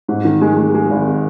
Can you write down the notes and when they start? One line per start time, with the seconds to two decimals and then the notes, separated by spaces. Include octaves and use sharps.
0.08 G#2
0.25 D#3
0.41 G#3
0.57 G#3
0.74 G#3
0.91 G#1